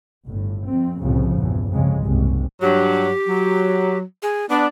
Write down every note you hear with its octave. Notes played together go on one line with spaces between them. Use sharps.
G1 A2
F2 C4
C2 F2 A2 C#3 F3
A#1 E2 G2
C2 F2 C#3 G#3
F#1 C2 G#2 C3
G2 F#3 G4
F#3
G#4
B3 D4